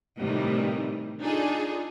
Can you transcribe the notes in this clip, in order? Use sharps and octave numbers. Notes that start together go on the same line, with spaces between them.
A2 C3 D#3 E3 G3
D4 D#4 F4 G#4 A4